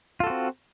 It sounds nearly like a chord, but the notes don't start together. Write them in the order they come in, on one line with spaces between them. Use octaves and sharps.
F4 A4 F#4 C4